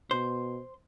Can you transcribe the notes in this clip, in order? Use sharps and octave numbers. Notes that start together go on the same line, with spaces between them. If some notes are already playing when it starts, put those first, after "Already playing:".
B2 C5